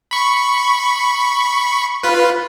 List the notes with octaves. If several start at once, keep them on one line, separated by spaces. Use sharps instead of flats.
B5 C#6
F4 B4